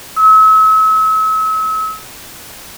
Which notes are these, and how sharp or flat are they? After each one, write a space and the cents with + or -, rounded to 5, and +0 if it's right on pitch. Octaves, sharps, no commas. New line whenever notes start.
E6 -40